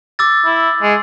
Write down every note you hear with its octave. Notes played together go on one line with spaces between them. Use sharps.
D6 E6 A6
E4
G#3